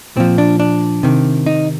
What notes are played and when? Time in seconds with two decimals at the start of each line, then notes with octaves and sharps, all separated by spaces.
0.16 A#2 F3 C4
0.38 D4
0.60 D4
1.03 C3 D#3
1.46 D#4